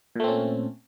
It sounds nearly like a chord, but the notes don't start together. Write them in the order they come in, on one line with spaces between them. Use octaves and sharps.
A#2 A3 C4 C#4